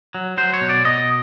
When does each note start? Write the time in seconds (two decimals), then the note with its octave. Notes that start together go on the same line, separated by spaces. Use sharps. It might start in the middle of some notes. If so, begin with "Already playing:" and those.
0.15 F#3
0.38 F#3 C5
0.54 C#5
0.61 B2
0.69 D5
0.85 B2 D#5